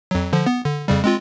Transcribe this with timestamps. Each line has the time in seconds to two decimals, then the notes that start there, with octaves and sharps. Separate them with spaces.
0.11 F2 F#3
0.33 D3 F3
0.46 B3
0.65 D3
0.88 F2 C#3 G3
1.04 G#3 C4 F4